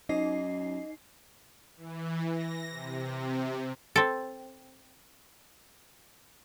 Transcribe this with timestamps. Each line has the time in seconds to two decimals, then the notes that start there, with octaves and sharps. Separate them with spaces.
0.09 F#2 D#4 D#5 C7
1.77 E3
2.29 A#6
2.70 C3
3.96 C4 A4